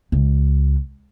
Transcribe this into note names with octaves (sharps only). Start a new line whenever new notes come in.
C#2